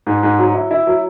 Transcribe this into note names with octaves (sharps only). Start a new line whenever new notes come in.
G#2
G#2
F#3
E4
E4
F#3